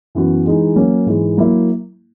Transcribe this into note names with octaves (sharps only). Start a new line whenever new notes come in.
F#2 E3 B3 F#4
E3 G#3 D#4
F#3 A#3 C#4
G#2 E3 G#3
F#3 A#3 E4